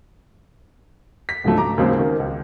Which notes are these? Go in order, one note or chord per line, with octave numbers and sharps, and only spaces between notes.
B6
C#2 G#2 D3 F3 F#3 A3
A#5 D6
D#2 C#3 F#3 G#3 C4
D#3
C#2